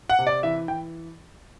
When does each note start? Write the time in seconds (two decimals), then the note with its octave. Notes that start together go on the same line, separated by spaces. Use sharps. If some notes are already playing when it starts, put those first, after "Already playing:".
0.09 F#5
0.19 C3
0.27 D5
0.43 E3 E5
0.68 E3 G5